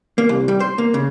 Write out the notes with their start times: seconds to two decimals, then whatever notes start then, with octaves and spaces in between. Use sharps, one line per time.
0.18 A#3
0.29 C2
0.48 G3
0.60 C5
0.78 A#3
0.94 C#3